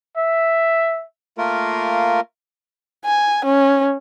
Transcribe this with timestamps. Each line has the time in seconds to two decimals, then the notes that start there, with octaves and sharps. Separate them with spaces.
0.17 E5
1.38 A3 A#3 F4 A#4
3.05 G#5
3.45 C#4